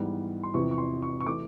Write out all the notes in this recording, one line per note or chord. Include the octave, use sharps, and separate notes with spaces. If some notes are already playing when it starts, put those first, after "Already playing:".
Already playing: G#2 E3 G3 B3
C6
E2 C3 F3 C#6
C#6
C6
C#6
C#6
E3 A3 D6